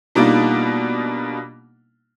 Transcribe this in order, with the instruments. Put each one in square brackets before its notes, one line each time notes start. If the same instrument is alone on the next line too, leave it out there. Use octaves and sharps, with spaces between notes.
[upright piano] B2 G3 A#3 D4 D#4 F4